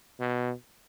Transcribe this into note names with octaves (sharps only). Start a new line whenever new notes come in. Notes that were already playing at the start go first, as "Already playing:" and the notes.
B2